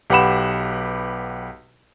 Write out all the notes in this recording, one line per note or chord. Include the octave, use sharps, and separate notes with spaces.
B1 G4 B4 F#5 B5 E7